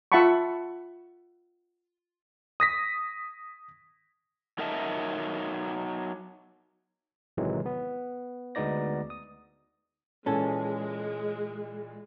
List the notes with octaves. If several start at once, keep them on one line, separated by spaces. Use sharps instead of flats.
F4 E5 F#5 A5 B5 C#6
D#6 A#6 B6
F#3 D#4 A#4 D#5 E5 A5
A1 C3 D#3 E3 F#3 G#3
B3
D2 G#3 B3 D#4 D5 A#6
D#6
A#2 E3 G#3 C#4 A4